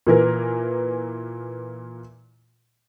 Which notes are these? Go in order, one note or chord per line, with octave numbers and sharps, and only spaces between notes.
A#2 E3 A#4